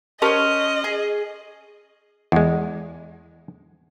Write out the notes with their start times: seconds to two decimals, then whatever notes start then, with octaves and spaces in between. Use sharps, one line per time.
0.22 C#4 G4 A#4 C5 C#5 D#5 A5
0.84 G#4
2.32 E2 G#3